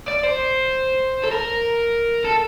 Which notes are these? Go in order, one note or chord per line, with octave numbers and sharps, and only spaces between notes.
D5
C5
A4
A#4
A4